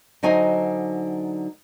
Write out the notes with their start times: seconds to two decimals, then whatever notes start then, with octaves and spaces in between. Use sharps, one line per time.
0.23 D3 F#3 D#4 C5 D#5 G#5